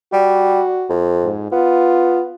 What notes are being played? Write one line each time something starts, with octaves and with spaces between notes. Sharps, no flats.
G3 F#4
F2
G#2
B3 F4